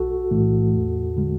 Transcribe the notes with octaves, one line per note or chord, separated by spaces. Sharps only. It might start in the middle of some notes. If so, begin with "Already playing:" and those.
Already playing: B1 F#4 A4
A2 E3 A3
E2
D3 G#3